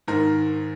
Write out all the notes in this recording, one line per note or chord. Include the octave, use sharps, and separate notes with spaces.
G#2 D#3 A#4